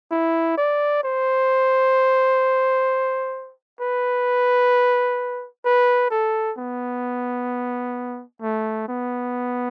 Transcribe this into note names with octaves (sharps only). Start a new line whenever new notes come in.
E4
D5
C5
B4
B4
A4
B3
A3
B3